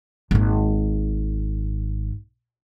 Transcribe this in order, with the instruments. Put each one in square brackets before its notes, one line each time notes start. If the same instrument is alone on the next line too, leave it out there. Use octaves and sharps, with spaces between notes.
[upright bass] G#1 A#3